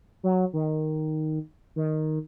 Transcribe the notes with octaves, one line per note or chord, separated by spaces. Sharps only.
F#3
D#3
D#3